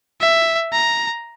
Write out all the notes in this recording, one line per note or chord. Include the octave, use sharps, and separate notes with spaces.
E5
A#5